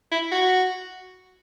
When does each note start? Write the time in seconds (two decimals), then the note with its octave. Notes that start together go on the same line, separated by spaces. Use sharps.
0.11 E4
0.31 F#4